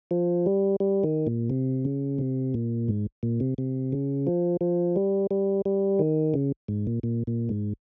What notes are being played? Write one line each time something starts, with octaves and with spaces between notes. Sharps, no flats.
F3
G3
G3
D#3
A#2
C3
C#3
C3
A#2
G#2
A#2
C3
C3
C#3
F3
F3
G3
G3
G3
D#3
C#3
G#2
A#2
A#2
A#2
G#2